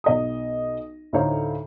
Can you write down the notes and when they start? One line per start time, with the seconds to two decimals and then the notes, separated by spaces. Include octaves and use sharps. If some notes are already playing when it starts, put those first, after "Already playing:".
0.04 B1 D#5 D#6
1.13 D2 A2 D#4 C5 C#5 F5